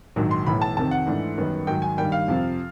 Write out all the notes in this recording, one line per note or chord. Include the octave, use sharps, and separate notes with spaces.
A#1 G#2 D#3 F#3
C6
B1 A2 E3 B5
A5
F2 C3 D#3 A5
F#5
G#2 E3 A3 D4
F#2 D#3 G3 B3
G#2 D#3 F#3 G5
G#5
G2 D#3 G3 A#3 G5
F5
F2 C3 F3